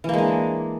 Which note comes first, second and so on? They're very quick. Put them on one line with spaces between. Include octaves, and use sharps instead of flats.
E3 A#3 G#3 D4